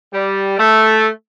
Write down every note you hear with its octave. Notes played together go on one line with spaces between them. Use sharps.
G3
A3